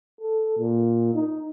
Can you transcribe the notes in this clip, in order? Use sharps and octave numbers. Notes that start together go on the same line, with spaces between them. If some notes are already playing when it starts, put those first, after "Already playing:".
A4
A#2
D#4